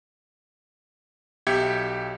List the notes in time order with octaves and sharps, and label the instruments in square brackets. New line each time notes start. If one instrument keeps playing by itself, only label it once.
[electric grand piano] B1 G4 E5 G6 G#6 C#7